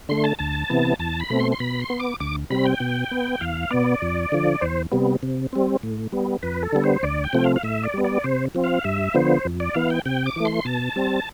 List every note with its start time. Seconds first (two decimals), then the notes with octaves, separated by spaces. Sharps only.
0.09 D3 A3 C6
0.24 A5
0.39 D2 A5
0.70 C3 E3 B3
0.99 E2 A5
1.20 B5
1.30 B2 A3 C4
1.40 C6
1.52 C6
1.60 B2 B5
1.79 C6
1.90 B3
2.00 D6
2.20 D2 D6
2.50 C3 G3 C4 B5
2.65 G5
2.80 B2
3.11 B3
3.41 E2 F5
3.71 B2 B3 D5
4.02 F2
4.32 D3 F3
4.61 E2 C5
4.92 C3 G3 B3
5.23 C3
5.53 G3 C4
5.83 A2
6.12 G3 B3
6.43 F2 B4
6.63 A4
6.73 D3 G3 B3
6.84 C5
7.03 D2 D5
7.24 G5
7.33 C3 F3 A3 C4
7.44 F5
7.56 F5
7.63 A2 E5
7.83 D5
7.94 G3 B3
8.04 D5
8.24 C3 C5
8.55 F3 C4
8.64 F5
8.84 G2 E5
9.14 D3 F3 B3 C5
9.45 F2
9.60 D5
9.75 E3 B3 F5
9.90 G5
10.06 C3 G5
10.26 D6
10.36 E3 A3
10.45 C6
10.65 B2 A5
10.96 G3 C4